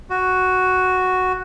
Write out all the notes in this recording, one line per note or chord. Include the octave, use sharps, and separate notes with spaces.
F#4